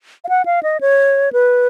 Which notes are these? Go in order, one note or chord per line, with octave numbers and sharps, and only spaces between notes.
F5
F#5
F5
D#5
C#5
B4